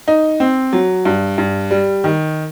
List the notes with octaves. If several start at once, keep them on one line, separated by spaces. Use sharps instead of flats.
D#4
C4
F#3
G2
G2
G3
D#3